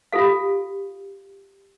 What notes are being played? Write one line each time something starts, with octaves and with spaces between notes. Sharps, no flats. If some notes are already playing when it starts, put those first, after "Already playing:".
F4 G4 A4 F5